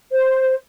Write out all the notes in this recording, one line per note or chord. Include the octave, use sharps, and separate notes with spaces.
C5